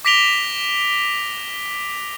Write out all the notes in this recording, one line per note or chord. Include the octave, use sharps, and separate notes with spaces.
D6 A#6 B6 D7 F7 G7